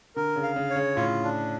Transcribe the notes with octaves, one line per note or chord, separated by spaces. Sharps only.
D3 A#4
C#3
F5
C#3
C#5
C#3
A2 F4
D4